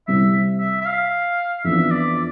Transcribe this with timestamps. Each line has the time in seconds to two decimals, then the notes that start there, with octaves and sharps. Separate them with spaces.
0.07 C2 C3 G3 C4 E5
0.60 E5
0.81 E5
0.86 F5
1.64 F2 E3 B3 D4 E5
1.91 D5